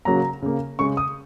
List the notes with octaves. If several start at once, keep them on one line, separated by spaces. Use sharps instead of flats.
C#3 F#3 A#3 A#5
C#3 A#3
C#3 G#3 C#6
D#6